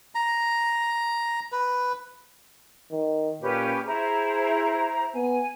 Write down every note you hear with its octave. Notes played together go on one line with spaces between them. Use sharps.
A#5
B4
D#3
A#2 C#4 G4 B4
E4 G#4 C5 A#5
B3 G#5